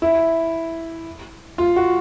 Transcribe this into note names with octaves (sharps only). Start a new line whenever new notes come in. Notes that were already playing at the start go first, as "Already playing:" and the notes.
E4
F4
F#4